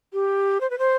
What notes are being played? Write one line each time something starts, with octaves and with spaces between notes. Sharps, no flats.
G4
C5
B4
C5